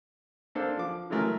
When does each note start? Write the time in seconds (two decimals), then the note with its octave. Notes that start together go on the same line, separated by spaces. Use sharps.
0.55 A#3 D4 A4 C5
0.77 F3 D6
1.10 E3 F#3 G#3 A3 A#4